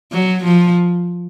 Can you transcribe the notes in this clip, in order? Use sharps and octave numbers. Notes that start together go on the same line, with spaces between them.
F#3
F3